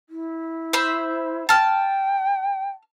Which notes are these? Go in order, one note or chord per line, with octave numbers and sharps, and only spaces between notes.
E4
C5 E5 B5
G5 A5 F6